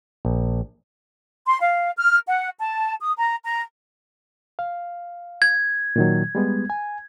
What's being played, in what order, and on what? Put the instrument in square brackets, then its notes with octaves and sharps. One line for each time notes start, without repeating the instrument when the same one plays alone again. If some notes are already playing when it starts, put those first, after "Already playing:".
[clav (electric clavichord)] A#1
[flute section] C6
F5
F6
F#5
A5
D#6
A#5
A#5
[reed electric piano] F5
[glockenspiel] G#6
[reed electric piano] A#2 D#3 F#3
G3 G#3 B3
G#5